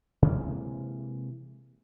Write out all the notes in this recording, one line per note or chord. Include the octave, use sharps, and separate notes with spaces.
C3 E3 G#3 A#3